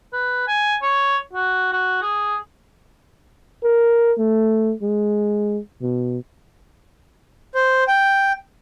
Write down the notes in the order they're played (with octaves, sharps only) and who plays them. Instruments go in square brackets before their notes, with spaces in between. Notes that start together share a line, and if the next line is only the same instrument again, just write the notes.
[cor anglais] B4
G#5
C#5
F#4
F#4
G#4
[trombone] A#4
A3
G#3
B2
[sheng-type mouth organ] C5
G5